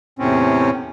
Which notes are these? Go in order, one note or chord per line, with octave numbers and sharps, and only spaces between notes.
E2 A2 C3 C4 C#4